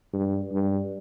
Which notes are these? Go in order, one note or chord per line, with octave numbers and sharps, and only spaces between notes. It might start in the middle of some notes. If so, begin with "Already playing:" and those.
G2
G2